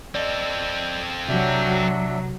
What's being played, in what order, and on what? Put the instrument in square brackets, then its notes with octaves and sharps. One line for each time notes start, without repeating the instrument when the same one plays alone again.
[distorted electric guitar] C4 A4 [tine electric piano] D5 D#5
[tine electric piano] B1 C3 [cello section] F#3 [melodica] D4 E5